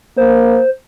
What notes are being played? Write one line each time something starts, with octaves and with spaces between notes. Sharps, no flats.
A#3 C5